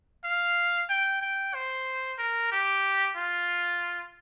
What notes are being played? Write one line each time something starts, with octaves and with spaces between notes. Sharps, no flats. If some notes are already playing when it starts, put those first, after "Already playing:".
F5
G5
G5
C5
A#4
G4
F4